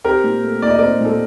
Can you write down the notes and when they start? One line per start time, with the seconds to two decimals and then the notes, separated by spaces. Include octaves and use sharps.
0.04 C4 G4 A#4
0.24 A#2
0.43 A3
0.62 A#2 D5
0.70 D#5
0.79 C4 A#4 D5
1.01 A#2 A4